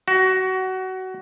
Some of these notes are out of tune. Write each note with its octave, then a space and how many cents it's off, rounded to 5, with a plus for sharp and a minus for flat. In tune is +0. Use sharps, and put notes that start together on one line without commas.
F#4 +20